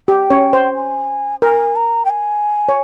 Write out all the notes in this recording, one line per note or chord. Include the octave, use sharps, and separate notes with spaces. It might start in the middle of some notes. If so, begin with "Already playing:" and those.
G4 G5
C#4 C#5
C5
G#5
A#4 G#5
A#5
G5
G#5
C#5